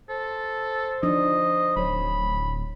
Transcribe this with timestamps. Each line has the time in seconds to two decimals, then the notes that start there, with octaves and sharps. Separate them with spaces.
0.09 A4 C5
1.03 F3 D4 D#4 D#5
1.76 D1 F#3 C#5 B5